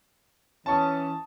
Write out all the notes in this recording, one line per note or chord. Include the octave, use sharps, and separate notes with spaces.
E3 C#4 A5 C#6 D#6